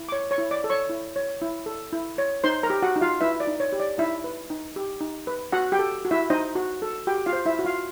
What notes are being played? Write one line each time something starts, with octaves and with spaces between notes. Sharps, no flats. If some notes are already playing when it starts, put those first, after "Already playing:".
Already playing: E4
D6
C#5 C#6
C#5 C#6
E4
D5 D6
A4
C#5 C#6
E4
C#5
E4
A4
E4
C#5
D#4 C5 C6
A#4 A#5
G4
F#4 F#5
D#4
F4 F5
E4 B4 E5
D5
D#4
C#5
G4
D5
D#4 E4 E5
B4
D#4
G4
D#4
B4
F#4 F#5
G4 G5
A4
F#4
E4 E5
D#4 C5 D#5
F#4
A4
F#4 G4 G5
F4 F5
C5
E4 E5
F#4
F4 F5